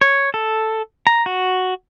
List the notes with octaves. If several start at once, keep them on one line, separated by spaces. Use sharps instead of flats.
C#5
A4
A#5
F#4